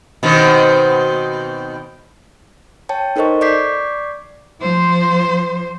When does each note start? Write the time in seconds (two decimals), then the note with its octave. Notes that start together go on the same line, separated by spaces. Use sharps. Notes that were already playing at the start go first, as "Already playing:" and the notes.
0.23 B2 D#3 C4
2.89 C#5 G5 A5
3.16 D#4 A4 A#4 C5 D#5 C#6
3.41 D5 C#6 D6 G6 B6 C7
4.60 F3 C5